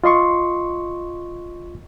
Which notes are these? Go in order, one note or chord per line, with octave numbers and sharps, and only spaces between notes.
F4 D#5 C6 C#6